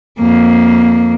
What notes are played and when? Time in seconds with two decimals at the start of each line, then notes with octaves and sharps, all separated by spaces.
0.18 F2 A#3